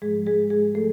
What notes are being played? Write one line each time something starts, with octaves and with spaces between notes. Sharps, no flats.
G#2 F3 G#3 G#4
G#3 G#4
G#3 G#4
F3 A3 A4